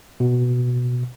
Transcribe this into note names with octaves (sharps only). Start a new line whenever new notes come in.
B2